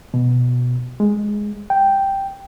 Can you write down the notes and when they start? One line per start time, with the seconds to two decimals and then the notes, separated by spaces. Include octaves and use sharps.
0.14 B2
1.00 G#3
1.70 G5